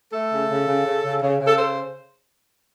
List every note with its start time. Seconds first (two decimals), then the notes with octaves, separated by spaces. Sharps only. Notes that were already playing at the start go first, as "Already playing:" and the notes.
0.13 A3 A4
0.31 C#3
0.50 C#3
0.67 C#3
0.86 C#3
1.04 C#3
1.22 C#3
1.40 C#3
1.47 A4
1.58 C5